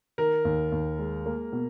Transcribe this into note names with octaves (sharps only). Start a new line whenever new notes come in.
D#3 A#4
D#2
D#2
G#3
A#3
B2